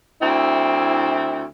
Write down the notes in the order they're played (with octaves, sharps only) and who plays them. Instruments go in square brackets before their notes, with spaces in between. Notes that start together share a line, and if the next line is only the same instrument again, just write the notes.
[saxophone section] D2 C4 E4